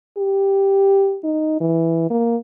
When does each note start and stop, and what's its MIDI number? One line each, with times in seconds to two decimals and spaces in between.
0.18 1.18 67
1.24 1.56 63
1.60 2.08 52
2.10 2.36 58